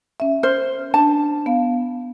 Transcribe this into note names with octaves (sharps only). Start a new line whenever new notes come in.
C#4 E5
C5 F6
D4 A5
B3 F5